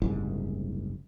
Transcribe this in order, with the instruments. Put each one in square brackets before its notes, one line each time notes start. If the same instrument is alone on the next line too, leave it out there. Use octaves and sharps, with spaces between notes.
[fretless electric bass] F#1 C2 G#2